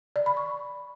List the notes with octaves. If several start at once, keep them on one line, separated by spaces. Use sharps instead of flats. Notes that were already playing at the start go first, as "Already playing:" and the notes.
D5
B5
C#6